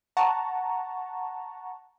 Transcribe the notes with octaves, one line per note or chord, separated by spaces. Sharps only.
F#5 A5 A#5 C#6